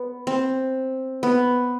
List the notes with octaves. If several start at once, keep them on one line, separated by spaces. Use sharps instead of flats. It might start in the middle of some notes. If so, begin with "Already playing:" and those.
Already playing: B3
C4
B3